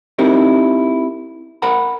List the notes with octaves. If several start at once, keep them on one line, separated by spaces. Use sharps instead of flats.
C4 D#4 E4 G4 A#4
A#4 F#5 A#5 B5